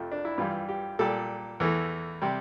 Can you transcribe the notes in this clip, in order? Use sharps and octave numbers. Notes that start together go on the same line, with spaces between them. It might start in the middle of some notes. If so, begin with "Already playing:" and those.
Already playing: F2 C3 F3 A3
D4
E4
G2 E3 G3 F4
G4
A#2 G3 A4
E2 E3 A3
C3 G3